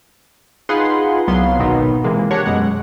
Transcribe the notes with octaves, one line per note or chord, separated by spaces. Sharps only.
D#4 F4 G#4 B4 F#5 C6
C2 F#3 B3 F5 C6
G#1 B2 D#3 F#3 B3 D#4
C3 E3 G#3 A#3
D4 G4 A#4 C#5 F#5
F#2 B2 G#3 F#5